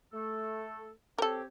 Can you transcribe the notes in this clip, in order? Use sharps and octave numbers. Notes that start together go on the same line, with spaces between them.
A3 A4
C4 G4 A4 A#4 C#5